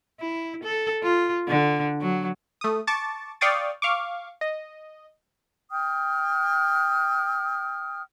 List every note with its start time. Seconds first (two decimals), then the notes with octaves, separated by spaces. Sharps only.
0.20 E4
0.63 A4
1.03 F4
1.48 D3
2.01 F#3
2.61 A3 D#6
2.87 A5 C#6 D6 A6
3.41 D5 F5 G5 C#6 D#6 A6
3.82 F5 C#6 D6
4.41 D#5
5.71 G5 D#6 F6